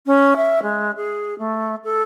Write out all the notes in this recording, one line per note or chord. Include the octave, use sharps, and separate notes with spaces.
C#4
E5
G#3
G#4
A3
A4